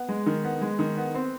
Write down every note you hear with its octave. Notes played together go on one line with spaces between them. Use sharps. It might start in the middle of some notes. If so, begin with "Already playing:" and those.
Already playing: B3
G#3
D#3
B3
G#3
D#3
B3
C4